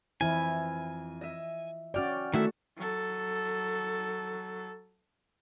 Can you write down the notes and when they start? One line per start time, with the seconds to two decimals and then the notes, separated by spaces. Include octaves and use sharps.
0.21 F2 E3 E4 G#5
1.21 D#5 E5
1.94 C#4 F#4 D5 G5 F6
2.34 D#3 A3 E4 F#4 A4 E5
2.77 F#3 A4